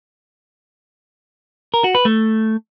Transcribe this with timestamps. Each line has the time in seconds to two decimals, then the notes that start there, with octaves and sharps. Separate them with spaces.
1.74 A#4
1.84 F#4
1.95 B4
2.05 A3